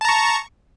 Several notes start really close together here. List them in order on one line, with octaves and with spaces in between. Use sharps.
A5 A#5 C#6